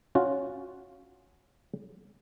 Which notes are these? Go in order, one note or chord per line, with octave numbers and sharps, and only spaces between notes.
C#4 F4 F#4